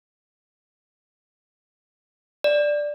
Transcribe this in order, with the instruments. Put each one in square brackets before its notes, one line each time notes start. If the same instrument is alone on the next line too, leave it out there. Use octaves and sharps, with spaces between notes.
[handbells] D5